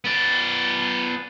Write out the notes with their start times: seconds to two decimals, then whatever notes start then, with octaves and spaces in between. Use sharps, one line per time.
0.05 B3 D5